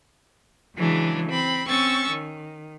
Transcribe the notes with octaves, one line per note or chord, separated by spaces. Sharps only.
C#3 E3 F#3 G#3 D4
C4 B5
C4 C#4 C#6 E6 A6
D#3